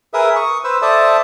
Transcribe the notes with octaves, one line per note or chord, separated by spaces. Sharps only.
G#4 A#4 B4 E5 D#6
C#6 D#6
B4 C5 E6
A4 C5 D5 E5 A5 D#6